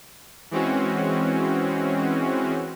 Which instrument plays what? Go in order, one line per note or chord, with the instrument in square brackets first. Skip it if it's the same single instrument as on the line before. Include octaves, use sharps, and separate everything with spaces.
[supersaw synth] E3 G#3 C4 C#4 F#4